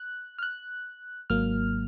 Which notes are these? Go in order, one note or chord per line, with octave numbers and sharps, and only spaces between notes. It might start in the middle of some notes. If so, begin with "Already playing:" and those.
Already playing: F#6
F6
F#6
G#1 G#2 F#3 A#3 F6